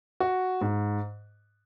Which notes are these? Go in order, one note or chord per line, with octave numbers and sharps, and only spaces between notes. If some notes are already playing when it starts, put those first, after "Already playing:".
F#4
G#2